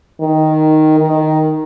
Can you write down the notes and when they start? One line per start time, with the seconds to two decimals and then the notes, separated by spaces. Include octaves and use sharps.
0.21 D#3
1.00 D#3